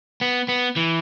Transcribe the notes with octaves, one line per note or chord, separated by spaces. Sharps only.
B3
B3
E3